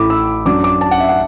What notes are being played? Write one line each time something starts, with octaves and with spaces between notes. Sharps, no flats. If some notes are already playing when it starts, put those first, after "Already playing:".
Already playing: A1 A2 A3 E4 B5 D6
E6
F#2 F#3 D4 D6
D6
A5
F#5
E5
F#5